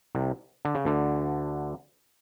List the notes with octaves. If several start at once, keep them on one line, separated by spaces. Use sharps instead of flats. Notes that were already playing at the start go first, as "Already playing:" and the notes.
C2 C3
D3
C#3
D2 D3